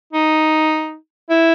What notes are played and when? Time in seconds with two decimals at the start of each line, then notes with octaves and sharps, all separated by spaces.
0.13 D#4
1.30 E4